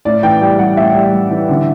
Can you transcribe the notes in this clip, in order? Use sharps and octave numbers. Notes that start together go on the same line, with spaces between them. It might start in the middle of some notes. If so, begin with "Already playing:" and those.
A2 D5
E3 G5
G3 G5
G3 F#5
A2 E5
G3
G3
E3
D3